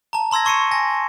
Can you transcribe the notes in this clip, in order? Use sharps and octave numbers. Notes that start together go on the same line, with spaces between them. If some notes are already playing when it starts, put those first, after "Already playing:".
A5 A#5
A#5 C6 E6 G#6 A#6
A5 C#6 C7 C#7 D#7 E7
G#5 A#6